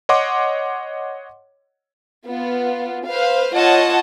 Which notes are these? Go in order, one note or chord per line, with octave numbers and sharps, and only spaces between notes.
C#5 D#5 F#5 C6 D6
B3 F4
B4 C5 F5
F4 C#5 D#5 F#5 A5